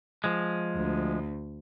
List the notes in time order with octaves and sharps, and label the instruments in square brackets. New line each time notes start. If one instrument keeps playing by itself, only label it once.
[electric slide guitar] F3 G#3
[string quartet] D2